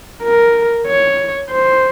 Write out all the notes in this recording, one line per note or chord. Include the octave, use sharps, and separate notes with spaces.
A#4
C#5
C5